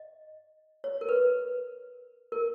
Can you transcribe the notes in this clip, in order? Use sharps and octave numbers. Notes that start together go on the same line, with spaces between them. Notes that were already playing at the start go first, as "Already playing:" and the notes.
Already playing: D#5
C#5
A#4
B4
A#4